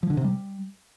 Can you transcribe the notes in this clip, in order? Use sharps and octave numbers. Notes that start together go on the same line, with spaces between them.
F3
D3
C3
G3